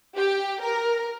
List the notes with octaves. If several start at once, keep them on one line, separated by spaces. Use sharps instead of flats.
G4
A#4